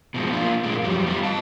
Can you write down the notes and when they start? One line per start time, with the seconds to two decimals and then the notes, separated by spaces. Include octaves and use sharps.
0.14 B2 F3 G#3
0.31 A#3 D4 F4
0.63 A#2 G#3 A#3
0.82 F2 F#3 G3
1.06 G3 B3 C#4 F4
1.23 D#5 A5